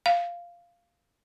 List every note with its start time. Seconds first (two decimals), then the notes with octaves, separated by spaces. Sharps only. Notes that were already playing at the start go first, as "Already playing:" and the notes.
0.06 F5